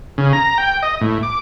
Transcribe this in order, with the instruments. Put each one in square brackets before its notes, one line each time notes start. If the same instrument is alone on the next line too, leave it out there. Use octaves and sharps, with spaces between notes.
[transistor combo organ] C#3
A#5
G5
D#5
A2
D6